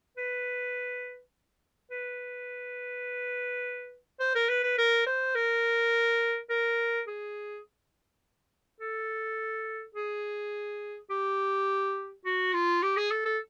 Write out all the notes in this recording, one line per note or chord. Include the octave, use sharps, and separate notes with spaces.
B4
B4
C5
A#4
B4
B4
A#4
C5
A#4
A#4
G#4
A4
G#4
G4
F#4
F4
G4
G#4
A4
A4